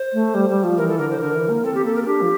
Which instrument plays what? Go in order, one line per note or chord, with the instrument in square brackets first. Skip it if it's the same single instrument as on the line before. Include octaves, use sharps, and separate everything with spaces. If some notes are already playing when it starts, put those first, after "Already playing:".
Already playing: [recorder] C5
[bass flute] A3
G3
G3
F3
[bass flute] E3 [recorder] A#4
[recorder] A4
[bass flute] D3 [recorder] A#4
[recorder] C5
[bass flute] D3 [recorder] A#4
[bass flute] E3
A#3
[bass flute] C4 [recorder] A4
[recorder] G4
[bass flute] A#3 [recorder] A4
[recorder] A#4
A4
[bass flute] D4 [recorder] G4
[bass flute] F3